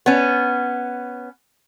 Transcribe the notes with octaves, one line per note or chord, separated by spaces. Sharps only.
B3 C#4